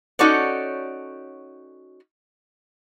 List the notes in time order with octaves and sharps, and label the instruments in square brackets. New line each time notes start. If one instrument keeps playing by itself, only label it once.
[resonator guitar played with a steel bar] C#4 D#4 F#4 A4 C#5 D5